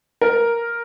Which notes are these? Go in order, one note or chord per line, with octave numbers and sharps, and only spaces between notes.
A#4